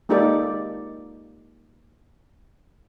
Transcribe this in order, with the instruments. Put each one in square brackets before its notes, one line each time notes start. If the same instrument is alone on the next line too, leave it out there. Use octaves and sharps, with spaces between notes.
[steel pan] G#3 A#3 D#4 G4 A4 D5